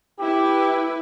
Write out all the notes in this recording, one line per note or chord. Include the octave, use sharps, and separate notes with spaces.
E4 G4 B4